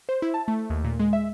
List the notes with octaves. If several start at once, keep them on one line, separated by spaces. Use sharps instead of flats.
C5
E4
A5
A3
D#2
A#2
G#3
E5